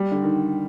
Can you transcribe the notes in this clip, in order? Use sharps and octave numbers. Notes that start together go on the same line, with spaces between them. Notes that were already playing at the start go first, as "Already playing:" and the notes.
Already playing: G3
D3
D#3